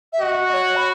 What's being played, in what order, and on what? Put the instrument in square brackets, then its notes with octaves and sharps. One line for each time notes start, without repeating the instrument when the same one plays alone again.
[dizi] E5
[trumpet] F#4 [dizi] D#5
[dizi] D#5
C#5
B5